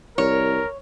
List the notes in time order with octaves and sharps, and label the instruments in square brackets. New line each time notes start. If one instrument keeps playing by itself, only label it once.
[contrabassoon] C2 [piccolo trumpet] A#4 [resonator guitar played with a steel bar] C#5